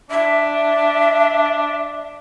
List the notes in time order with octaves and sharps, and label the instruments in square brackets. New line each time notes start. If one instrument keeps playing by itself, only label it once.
[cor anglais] D4 [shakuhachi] E5